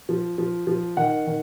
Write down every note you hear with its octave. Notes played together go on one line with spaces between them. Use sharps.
F3
F3
F3
D#3 F#5
D#3